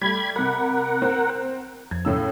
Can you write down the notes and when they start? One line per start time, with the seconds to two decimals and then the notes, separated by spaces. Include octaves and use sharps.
0.02 G3 A3 B5 G#6
0.36 C3 A#4 F#5 B5
1.02 C4
1.91 F2 G#6
2.05 A2 C#3 E6